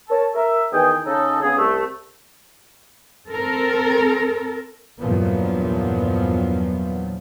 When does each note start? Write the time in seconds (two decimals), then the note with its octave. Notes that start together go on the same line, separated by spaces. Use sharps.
0.09 A#4 C#5 A5
0.35 A#4 E5
0.72 E2 D#3 G#4 G5
1.05 C#3 C#4 D#4 A4
1.41 C#3 B3 G#4
1.57 C2 A3
3.27 C4 A4 A#4
4.99 E2 G2 A#2 F3 F#3 B3